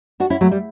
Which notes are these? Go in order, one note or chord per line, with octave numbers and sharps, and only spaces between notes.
D4 F#4
C#4 E4
F#3 A3
G3